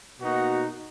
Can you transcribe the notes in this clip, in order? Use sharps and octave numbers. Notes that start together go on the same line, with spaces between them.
B2 A#3 D#4 F#4